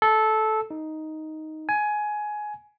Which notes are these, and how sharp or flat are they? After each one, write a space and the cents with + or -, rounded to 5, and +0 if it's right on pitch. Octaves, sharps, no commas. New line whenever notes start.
A4 -15
D#4 +5
G#5 +15